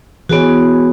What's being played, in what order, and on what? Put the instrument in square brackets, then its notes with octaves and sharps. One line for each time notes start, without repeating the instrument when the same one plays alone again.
[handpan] E3 G#4 C#5 [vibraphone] B3 F#4